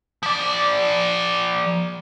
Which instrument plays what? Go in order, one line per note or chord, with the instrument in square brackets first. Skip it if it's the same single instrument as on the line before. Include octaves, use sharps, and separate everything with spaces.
[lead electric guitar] F3 D5